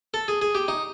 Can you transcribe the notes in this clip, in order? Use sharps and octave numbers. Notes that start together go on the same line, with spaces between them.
A4
G#4
G#4
G4
D#4